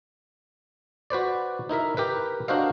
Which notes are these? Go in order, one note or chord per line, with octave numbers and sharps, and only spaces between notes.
F#4 B4 C5 D5
D#4 E4 A#4 E5
G4 A#4 B4
D4 F#4 A#4 C5 D#5 F5